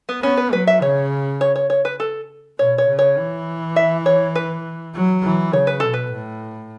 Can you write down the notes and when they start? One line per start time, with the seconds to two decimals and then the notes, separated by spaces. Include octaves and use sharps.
0.09 B3
0.22 B3 C#4
0.37 B4
0.53 F#3 B4
0.67 E5
0.82 C#3 C#5
1.41 C#5
1.56 C#5
1.70 C#5
1.85 B4
2.00 A4
2.59 B2 C#5
2.78 C#5
2.88 C#3
2.99 C#5
3.18 E3
3.76 E5
4.06 C#5
4.35 B4
4.95 F#3
5.23 E3
5.53 C#3 C#5
5.67 B4
5.80 B2 A4
5.94 B4
6.12 A2